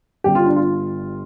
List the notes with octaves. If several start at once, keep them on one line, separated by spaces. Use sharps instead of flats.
G1 G2 G3 G4
F4
D4
F4